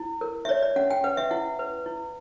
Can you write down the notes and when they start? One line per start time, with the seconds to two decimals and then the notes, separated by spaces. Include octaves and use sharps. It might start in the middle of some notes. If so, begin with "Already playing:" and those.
Already playing: E4
0.21 A#4
0.45 E5
0.49 C#5 D5
0.62 D5
0.76 C#4 F#5
0.90 G5
1.04 B4 F#5
1.17 E5
1.31 E4 F#5
1.59 B4
1.86 E4